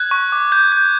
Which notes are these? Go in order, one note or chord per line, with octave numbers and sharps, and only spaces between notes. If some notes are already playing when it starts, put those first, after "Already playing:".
Already playing: F#6 G#6
C#6
D6
G6
G6